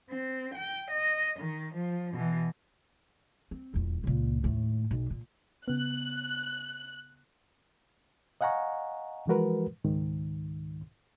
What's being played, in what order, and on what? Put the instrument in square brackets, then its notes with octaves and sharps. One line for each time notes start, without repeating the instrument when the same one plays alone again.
[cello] C4
G5
D#5
D#3
F3
B2 E3
[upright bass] C4
D#1 E2
C#2 A#2
D#2 A2
B1
A#2
[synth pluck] C#3 B3 [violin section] F#6
[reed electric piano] D#5 F5 F#5 G#5 A#5 C#6
E3 F3 G#3 F#4 A#4 B4
C#2 G#2 D#3